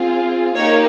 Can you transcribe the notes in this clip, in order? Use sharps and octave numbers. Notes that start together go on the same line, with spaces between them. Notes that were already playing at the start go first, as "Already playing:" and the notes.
Already playing: C4 F4 G#4
A#3 D#4 G4 C#5